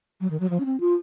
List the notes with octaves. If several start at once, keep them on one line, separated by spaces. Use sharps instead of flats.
F#3
D#3
F#3
F3
C#4
C4
F4